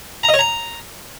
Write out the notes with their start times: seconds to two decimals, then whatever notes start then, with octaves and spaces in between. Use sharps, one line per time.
0.23 A#5
0.29 D#5
0.34 C#5
0.39 A#5